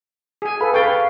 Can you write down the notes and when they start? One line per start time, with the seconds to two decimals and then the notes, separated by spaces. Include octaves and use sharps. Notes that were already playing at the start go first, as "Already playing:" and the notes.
0.42 G#4 G#5
0.60 A4 B4 F5 B5
0.74 B4 F5 G5 C#6 G#6 A6